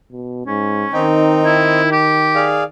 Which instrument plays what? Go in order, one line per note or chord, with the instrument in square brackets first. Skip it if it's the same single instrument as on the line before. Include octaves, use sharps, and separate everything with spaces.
[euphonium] B2
[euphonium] G#2 [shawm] C#4
[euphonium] D#3 [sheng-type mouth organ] C4 D#4 G5
[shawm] E4
G4
[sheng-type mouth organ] G#4 D5 F5